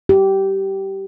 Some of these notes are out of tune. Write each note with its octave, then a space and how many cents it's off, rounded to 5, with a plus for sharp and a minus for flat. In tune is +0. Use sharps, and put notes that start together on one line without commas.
G4 -15